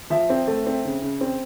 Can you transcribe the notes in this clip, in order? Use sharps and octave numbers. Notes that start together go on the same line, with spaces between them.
F3 E5
C4
A3
C4
C#3
C#3
C4